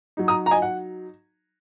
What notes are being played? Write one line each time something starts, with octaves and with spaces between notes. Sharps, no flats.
F#3 D#4
A#5 D#6
A#5
D#5 G#5
F#5